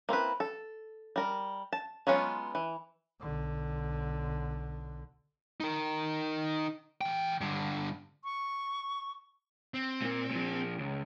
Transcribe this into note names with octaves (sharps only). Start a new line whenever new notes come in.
A#3 C4 E4 B4
A4
G3 A#4
A5
F#3 G#3 B3 C#4 F4
E3
B1 D3
D#4 A#4
E3 G5
G2 D3
C#6
C4
A#2 A#3
A#2 F3
C#2